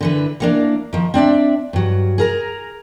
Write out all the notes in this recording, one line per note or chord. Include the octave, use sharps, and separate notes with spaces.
D3 E3 B4
E3 A#3 D4
D#3 F3
C4 D4 D5 E5
G2 F#3
G#4 A#4 A#5